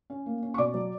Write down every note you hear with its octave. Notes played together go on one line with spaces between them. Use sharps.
C#4
A#3
C#4
C#6
B2 D5 D6
F#3